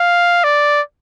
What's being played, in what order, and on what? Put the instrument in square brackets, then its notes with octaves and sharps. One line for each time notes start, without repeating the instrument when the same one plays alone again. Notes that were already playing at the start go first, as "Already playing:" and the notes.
Already playing: [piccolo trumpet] F5
D5